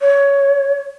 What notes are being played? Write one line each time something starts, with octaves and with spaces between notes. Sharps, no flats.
C#5